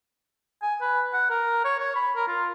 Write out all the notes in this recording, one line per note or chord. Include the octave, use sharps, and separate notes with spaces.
G#5
B4
F#5
A#4
C#5
C#5
B5
A#4
F4